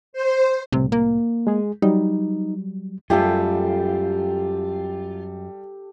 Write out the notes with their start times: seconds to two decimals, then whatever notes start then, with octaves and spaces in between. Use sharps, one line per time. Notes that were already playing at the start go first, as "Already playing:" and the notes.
0.13 C5
0.72 C2 A2 C3
0.92 A#3
1.47 G#3 G#4
1.82 F#3 G3 D#4
3.10 F#2 G3 A3 F4 G4 A4